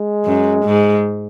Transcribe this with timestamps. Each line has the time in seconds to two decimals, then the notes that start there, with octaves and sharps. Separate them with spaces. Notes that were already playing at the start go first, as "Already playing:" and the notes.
Already playing: G#3
0.25 F#2
0.65 G#2